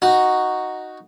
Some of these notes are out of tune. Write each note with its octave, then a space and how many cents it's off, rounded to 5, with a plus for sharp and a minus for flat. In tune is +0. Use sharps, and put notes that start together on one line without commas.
D#4 +0 F#4 +0